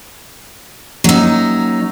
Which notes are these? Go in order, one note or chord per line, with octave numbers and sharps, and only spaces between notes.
F#3 A#3 C#4 D#4 E6